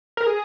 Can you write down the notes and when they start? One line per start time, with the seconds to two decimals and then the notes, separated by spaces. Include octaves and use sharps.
0.17 A#4
0.27 G#4